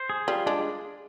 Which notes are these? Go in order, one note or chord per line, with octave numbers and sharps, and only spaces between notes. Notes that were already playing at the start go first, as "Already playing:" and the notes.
Already playing: C5
G#4
G3 F4
G#3 D4